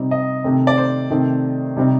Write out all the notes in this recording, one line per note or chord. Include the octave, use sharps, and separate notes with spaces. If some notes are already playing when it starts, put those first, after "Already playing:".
Already playing: C3 G3 C4 D#4
D#5
C3 D#3 A3 C4 D#4
D5
C5
C3 D#3 A3 C4
C3 G3 C4 D#4